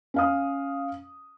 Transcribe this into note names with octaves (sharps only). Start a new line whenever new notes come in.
C#4 F5 D#6